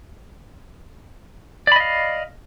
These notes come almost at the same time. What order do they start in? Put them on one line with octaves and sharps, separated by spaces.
D5 B5 D#5 F5